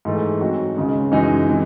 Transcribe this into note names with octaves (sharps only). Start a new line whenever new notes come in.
G#2 E3 A3
G#2 F#3 C4 F#4
C#2 C#3 G#3
F#2 E3 G#3 D#4 F#4
C3 E3 G#3